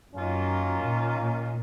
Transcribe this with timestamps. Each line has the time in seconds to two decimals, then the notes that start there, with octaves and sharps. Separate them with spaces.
0.14 F#2 D#3 A#3 C#4 F4
0.84 A#2
1.18 A#2